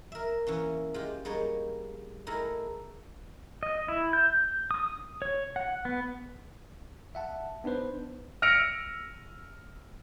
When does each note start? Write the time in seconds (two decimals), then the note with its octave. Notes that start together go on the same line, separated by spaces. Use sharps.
0.12 A#4 E5
0.47 E3 A#3 C#4
0.94 G#3 F4 G4
1.25 G3 G#3 A#3 D#4 C#5
2.27 A3 D#4 E4 G#4 A#4 A#5
3.63 D#5
3.88 E4
4.13 G6
4.71 D#6
5.22 C#5
5.56 F#5
5.85 B3
7.15 E5 F#5 A5
7.64 B3 D4 D#4 B4 C5
8.42 E6 F6 A#6 C#7 D7 F7